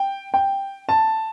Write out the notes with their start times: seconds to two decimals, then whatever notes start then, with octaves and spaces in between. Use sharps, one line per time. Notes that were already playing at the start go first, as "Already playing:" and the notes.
Already playing: G5
0.34 G5
0.89 A5